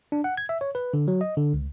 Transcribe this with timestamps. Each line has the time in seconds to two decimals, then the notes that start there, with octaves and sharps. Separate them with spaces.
0.12 D4
0.24 F#5
0.37 G#6
0.49 E5
0.61 C#5
0.75 B4
0.94 D3
1.08 F#3
1.21 D#5
1.37 D3
1.54 C#2